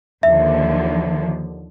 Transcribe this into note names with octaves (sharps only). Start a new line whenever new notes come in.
D#2 D3 F3 E5